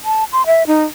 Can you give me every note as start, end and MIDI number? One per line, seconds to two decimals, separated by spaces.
0.05 0.24 81
0.32 0.46 84
0.46 0.66 76
0.67 0.84 63